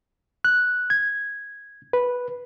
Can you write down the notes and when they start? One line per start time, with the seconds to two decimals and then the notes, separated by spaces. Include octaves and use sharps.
0.45 F#6
0.90 G#6
1.93 B4